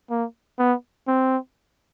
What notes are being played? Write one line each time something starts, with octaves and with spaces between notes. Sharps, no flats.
A#3
B3
C4